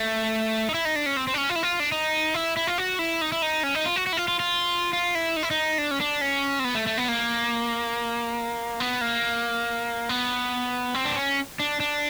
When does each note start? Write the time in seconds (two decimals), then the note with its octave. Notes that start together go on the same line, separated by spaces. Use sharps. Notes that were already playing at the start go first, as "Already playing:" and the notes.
Already playing: A3
0.69 D#4
0.74 E4
0.85 D#4
0.96 D4
1.06 C#4
1.17 C4
1.27 C4
1.34 D4
1.38 C#4
1.50 F4
1.56 E4
1.63 F4
1.80 D4
1.92 D#4
2.34 E4
2.57 E4
2.67 F4
2.78 F#4
2.99 E4
3.21 D#4
3.32 E4
3.42 D#4
3.63 C#4
3.75 D#4
3.86 F4
3.96 F#4
4.07 F#4
4.13 E4
4.17 F4
4.28 F4
4.40 F4
4.93 F4
5.15 E4
5.36 D#4
5.43 E4
5.51 D#4
5.78 D4
5.91 C#4
6.01 D4
6.21 C#4
6.59 C4
6.64 B3
6.75 A3
6.87 A3
6.98 B3
7.08 A#3
8.80 B3
9.01 A#3
10.09 B3
10.95 C4
11.05 D4
11.16 C#4
11.60 D4
11.80 D4